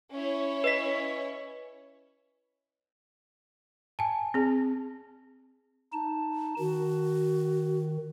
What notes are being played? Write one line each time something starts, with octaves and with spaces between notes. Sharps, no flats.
C#4 E4 C#5
B4 D#5 B6
G#5 A5
C4 G#4
D#4 A5
D#3 F#4